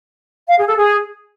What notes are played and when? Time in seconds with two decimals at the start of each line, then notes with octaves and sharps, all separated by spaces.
0.46 F5
0.56 G#4
0.66 A4
0.76 G#4